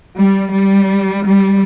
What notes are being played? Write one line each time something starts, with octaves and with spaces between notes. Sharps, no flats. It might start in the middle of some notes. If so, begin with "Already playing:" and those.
G3
G3
G3